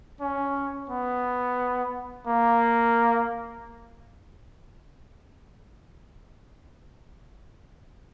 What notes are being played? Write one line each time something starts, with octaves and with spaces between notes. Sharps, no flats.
C#4
B3
A#3